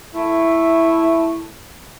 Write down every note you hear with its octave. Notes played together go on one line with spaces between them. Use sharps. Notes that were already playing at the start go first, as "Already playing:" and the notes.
A3 E4